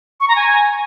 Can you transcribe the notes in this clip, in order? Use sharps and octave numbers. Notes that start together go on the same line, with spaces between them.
C#6
A#5
G#5